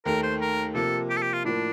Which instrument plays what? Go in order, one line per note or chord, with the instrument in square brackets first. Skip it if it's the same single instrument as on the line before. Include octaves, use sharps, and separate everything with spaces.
[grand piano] D#2 D#3 A3 [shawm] A#4
[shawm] C5
A#4
[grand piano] C3 F3 A#3 [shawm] A4
[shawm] G4
A4
G4
F4
[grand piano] A2 F3 A#3 [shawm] D4